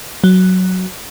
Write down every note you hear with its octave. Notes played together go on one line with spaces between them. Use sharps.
F#3